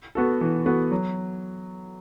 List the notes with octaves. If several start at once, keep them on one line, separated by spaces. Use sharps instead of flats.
B3 F#4 A4
E3
B3 F#4 A4
F#3